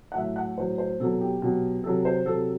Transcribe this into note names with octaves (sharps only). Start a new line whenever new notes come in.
F#5
A2 F#3 E5
F#5
A2 F#3 C5
C5
B2 F#3 A4
G4
B2 F#3
C3 F#3 A4
C5
C3 F#3 A4